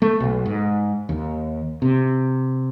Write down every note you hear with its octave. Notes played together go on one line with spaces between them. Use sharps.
A3
B1
G#2
D#2
C3